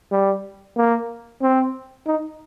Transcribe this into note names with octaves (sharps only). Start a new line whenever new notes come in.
G3
A#3
C4
D#4